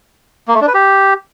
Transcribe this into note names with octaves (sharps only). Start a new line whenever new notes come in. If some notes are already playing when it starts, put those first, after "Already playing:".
A#3
A3
D4
B4
G4